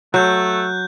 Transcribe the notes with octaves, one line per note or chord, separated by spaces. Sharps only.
F#3 A3 F#6 G6